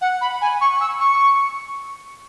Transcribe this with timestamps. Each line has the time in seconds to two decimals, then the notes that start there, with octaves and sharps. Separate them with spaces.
0.01 F#5
0.21 B5
0.41 G#5
0.61 C#6
0.81 E6
1.00 C#6